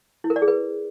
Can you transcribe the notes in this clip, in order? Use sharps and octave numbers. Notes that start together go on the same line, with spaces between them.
E4
A#4
D5
G#4
B4